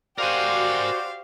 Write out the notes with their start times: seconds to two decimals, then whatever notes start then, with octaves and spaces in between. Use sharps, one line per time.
0.18 F#4 G4 A#4 C5 D5 F5 G#5